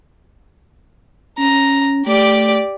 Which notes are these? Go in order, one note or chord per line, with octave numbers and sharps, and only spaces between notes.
C#4 A#5
A3 G4 D5